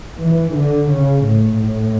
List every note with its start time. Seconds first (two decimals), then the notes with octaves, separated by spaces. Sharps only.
0.23 E3
0.57 D3
0.92 C#3
1.27 A2
1.62 A2